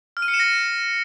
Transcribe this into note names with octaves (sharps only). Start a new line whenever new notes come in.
F6
D#7
C#7
E7
A#6